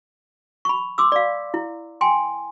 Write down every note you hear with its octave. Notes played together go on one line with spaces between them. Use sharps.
B5 C#6
C6 D6 E6
D5 F5
E4
G5 G#5 C6